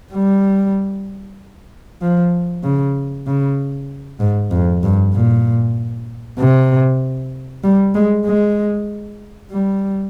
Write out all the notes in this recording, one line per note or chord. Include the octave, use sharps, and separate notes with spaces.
G3
F3
C#3
C#3
G#2
F2
G2
A#2
C3
G3
G#3
G#3
G3